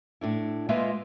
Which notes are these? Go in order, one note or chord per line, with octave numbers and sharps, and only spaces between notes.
A2 D4 E4
G#3 A#3 F4 B4 D#5 E5